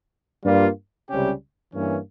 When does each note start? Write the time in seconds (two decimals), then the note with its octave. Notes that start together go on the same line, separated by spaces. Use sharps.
0.44 G2 G3 A#3 F4
1.09 C#2 C3 G3 C#4 G4
1.74 G2 E3 A#3 C#4